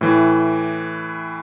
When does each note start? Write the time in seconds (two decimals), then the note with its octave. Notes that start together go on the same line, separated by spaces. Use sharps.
0.01 A2 E3